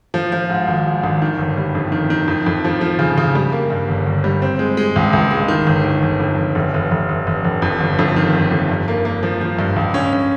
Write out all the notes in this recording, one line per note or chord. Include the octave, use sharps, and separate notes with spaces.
F3
F3
G#2
G#1
G#2
G#1
D#3
G1
G3
F2
D#3
D#3
F2
F2
F3
F3
C#3
C#3
G3
A#3
G2
G1
G1
G3
C4
G#3
G#3
C#2
C#2
G#3
D#3
G1
D#3
G1
F2
G1
F1
F1
F1
F1
F1
F1
F2
G1
F2
D#3
G1
F2
G2
A#3
A#3
F3
F3
G2
C#2
C#4
C#4